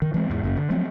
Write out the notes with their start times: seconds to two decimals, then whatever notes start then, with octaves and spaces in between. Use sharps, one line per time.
0.02 D#3
0.14 E3 G#3 C4
0.30 E2 G#2 E3
0.43 F#1 F#2 A#3
0.57 D3
0.70 F3 F#3 A3 C4